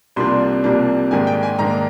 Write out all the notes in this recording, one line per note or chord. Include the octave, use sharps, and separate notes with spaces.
C2 C3 F3 A#3 D4 C6
C2 C3 F3 A#3 D4
G#2 D#3 A#3 D4 G#5
G5
G#5
G#2 D#3 A#3 D4 A#5